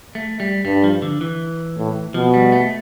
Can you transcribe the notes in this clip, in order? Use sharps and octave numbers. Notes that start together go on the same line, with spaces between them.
A3
G3
G2 G3
F3
D3
E3
A2
B2 F3
G3
A3